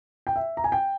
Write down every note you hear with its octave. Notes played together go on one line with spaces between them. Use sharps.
G5
E5
A#5
G#5
G5